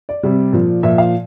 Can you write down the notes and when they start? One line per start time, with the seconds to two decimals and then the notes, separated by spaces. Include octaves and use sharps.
0.09 D5
0.23 C3 G3
0.53 A#2 F3
0.83 A#2 F3 E5
0.98 F5